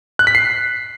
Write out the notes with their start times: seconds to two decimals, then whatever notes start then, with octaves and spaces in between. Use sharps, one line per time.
0.19 F#6
0.27 B6
0.35 C7